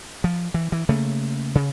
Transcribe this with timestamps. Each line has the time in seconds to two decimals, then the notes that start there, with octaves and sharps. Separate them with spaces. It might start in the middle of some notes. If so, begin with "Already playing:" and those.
0.24 F3
0.54 E3
0.72 E3
0.89 C#3 A3 A#3
1.55 C#3